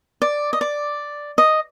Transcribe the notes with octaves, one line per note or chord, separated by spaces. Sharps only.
D5
D#5
D5
D#5